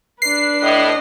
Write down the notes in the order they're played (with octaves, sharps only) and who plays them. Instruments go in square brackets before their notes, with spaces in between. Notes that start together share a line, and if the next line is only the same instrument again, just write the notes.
[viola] D4 B4 [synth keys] C7
[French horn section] A2 [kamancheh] D#5